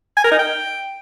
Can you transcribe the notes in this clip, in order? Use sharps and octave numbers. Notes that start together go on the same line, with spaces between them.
G#5
A#4
D#4
G5